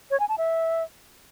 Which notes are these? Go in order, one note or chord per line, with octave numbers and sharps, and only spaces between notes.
C#5
G#5
A5
E5